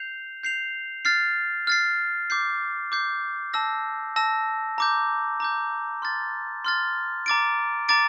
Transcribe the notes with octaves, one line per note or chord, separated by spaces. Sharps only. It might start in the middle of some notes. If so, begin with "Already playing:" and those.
Already playing: G6 C7 F7
G6 C7 F7
F6 A6 C7
F6 A6 C7
D6 G6 C7
D6 G6 C7
A5 E6 A#6
A5 E6 A#6
A#5 D6 G6
A#5 D6 G6
C6 F6 A6
C6 F6 A6
A#5 D6 A6 D7
A#5 D6 A6 D7